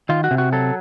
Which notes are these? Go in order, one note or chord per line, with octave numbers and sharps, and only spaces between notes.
D#3 F4
F#4
C3
F#4
F#3 A4